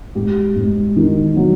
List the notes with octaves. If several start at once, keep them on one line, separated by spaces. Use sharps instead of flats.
G#2 G4
G#2
D#3
F#3